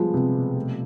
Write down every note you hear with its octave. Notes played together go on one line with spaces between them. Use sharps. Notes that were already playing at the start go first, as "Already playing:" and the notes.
Already playing: F3 G3 G#3 B3
C3 B3
B2
A3